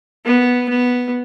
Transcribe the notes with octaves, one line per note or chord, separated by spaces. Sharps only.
B3
B3